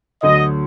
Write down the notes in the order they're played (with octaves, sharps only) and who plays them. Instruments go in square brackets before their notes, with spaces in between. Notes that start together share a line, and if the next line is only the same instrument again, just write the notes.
[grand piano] D2 D3 F#3 [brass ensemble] D#5